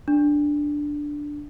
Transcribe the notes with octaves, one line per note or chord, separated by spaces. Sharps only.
D4